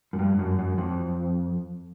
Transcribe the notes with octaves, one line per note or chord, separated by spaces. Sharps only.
F#2
G2
F#2
F#2
F2